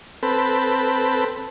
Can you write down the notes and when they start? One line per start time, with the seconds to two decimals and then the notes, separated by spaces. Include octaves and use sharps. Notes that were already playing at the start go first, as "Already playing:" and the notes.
0.23 C4 A4 B4